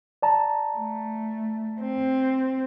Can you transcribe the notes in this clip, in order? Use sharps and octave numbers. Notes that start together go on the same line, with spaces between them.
D5 A5 A#5
A3
C4